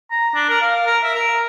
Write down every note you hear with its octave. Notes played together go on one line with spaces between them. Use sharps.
A#5
D4
A#4
F5
A#4
E5
A#4